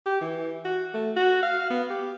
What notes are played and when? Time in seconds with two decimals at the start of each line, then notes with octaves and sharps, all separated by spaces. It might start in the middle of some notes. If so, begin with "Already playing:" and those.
0.06 G4
0.21 E3
0.65 F#4
0.94 A3
1.16 F#4
1.43 F5
1.70 B3
1.90 G4